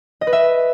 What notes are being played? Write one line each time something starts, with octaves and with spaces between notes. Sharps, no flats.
D#5
B4
E5